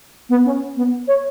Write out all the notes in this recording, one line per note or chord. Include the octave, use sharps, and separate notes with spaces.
B3
C#4
B3
C#5